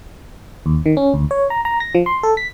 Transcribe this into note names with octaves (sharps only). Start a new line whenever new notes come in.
D#2
D#3
C#4
D2
C#5
A#5
A#5
A#6
F3
C6
A4
B6